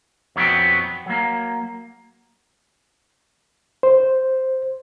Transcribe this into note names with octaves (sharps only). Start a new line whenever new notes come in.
F2 F#3 A#3 B3 F#4 G5
F#3 A#3
C5